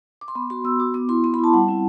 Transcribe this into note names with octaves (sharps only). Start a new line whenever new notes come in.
D6
C6
B3 B5
F#4 C6
B3 E6
F#4 D6
B3 D6
E4 C6
B3 C6
B5
E4 A5
G3 F#5
C4 E4